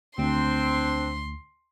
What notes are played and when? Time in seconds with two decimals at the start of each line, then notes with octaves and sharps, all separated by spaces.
0.18 D2 C4 D4 C6